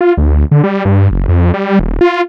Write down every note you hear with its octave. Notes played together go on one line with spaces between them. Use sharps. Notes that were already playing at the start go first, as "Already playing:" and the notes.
F4
D2
D3
G3
G2
F#1
F2
G3
D#1
F4